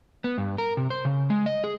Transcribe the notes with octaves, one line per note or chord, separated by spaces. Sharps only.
B3
G2
A#4
C3
C5
C#3
G#3
D#5
G#4